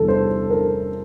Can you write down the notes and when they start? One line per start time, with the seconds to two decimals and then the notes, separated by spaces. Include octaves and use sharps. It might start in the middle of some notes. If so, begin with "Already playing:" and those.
Already playing: E2 C3 E3 G3 A4
0.08 C5
0.50 A#4